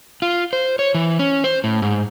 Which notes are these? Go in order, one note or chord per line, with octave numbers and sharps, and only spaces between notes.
F4
C5
C#5
E3
C#4
C5
A2
G#2